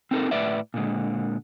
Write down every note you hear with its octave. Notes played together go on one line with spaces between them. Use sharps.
C4 D#4 A4 A#4
A2 B4 D5 E5
A#2 D3 G#3